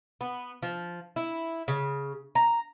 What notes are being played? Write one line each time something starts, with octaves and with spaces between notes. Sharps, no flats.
B3
F3
E4
C#3
A#5